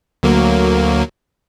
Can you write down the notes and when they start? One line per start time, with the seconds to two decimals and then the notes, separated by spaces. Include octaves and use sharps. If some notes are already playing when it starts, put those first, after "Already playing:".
0.23 D2 F#3 A#3